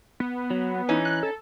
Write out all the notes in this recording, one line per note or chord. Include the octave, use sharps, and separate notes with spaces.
B3
F#3
E3 C#4 D#4
F#6
A4